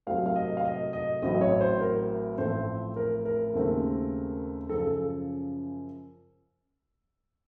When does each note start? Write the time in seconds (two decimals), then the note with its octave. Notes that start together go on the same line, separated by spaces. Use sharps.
0.07 C2 C3 F#3 A3 C4 F5
0.26 F5
0.36 D#5
0.57 F5
0.65 D#5
0.93 D#5
1.22 A1 A2 F#3 C4 D#5
1.41 C#5
1.61 C5
1.81 A#4
2.38 A1 A2 F3 A3 C4 C5
2.96 A#4
3.25 A#4
3.54 D#2 C#3 A3 C4
4.69 F#2 C#3 F3 A4
4.81 A4